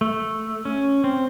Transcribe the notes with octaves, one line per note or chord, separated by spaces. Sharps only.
A3
C#4
C4